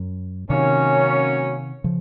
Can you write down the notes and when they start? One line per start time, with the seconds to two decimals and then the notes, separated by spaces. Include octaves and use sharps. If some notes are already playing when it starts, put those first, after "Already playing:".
Already playing: F#2
0.49 C3 D#3 F#3 A#3 C#4
1.84 C#3 F3